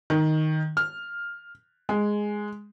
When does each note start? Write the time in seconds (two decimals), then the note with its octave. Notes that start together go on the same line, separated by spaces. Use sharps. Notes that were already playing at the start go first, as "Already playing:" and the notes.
0.10 D#3
0.77 F6
1.89 G#3